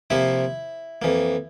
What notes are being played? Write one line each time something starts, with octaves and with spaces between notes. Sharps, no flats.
C3 F3 A#3 E4 E5
F2 E3 A#3